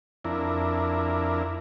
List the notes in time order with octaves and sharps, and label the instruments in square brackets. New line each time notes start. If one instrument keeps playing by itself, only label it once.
[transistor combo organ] F2 D4 E4 A#4